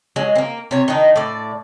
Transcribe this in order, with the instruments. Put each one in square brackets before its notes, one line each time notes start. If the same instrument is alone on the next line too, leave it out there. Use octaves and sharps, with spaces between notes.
[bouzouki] F#3 G#3
A#3 C4
C3 C#5
D#3 D4 D#4
A2 D5